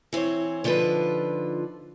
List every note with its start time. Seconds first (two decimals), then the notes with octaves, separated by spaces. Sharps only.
0.13 E3 C4 C5 C#5
0.64 D3 F3 D#4 F4 B4